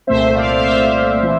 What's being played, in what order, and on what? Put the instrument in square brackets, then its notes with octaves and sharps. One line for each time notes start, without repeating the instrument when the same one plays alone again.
[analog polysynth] C2 A#2 A3 C4 C5 E5
D5 F5
F5
C5 E5
E3